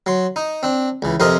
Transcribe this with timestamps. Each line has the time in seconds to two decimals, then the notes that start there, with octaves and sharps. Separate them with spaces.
0.06 F#3 C6
0.36 D#4
0.63 C4 D4
1.02 C#2 E3
1.20 F2 C3 F3 A#4 D#5 C6